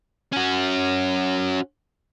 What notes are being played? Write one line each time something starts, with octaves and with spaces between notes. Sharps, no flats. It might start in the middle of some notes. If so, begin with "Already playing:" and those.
C#4 F#4